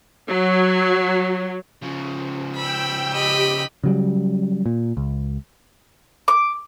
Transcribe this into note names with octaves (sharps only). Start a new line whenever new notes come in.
F#3
C#3 F3
G5 B5 E6
G4 D#5 B5
C#3 F#3 G3
A#2
C#2
D6